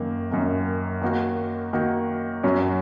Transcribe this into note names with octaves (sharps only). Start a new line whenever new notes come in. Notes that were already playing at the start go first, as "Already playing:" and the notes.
Already playing: F#2 D#3 A#3
F#2 D#3 A#3
D#3 A#3 F#4
D#3 A#3 F#4
F#2 F#3 C#4